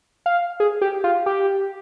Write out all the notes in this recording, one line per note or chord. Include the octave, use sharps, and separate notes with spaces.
F5
G#4
G4
F4
G4